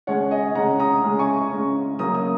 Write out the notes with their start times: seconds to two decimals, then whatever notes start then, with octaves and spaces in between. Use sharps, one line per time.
0.07 C#3 G#3 C#4 C#5 F#5
0.31 D#5 G#5
0.55 C#3 G#3 C#4 F#5 A#5
0.80 A#5 D#6
1.03 C#3 G#3 C#4
1.19 G#5 C#6
1.51 C#3 G#3 C#4
1.99 C#3 F#3 A#3 C#4 A#5 D#6
2.15 A#5 D#6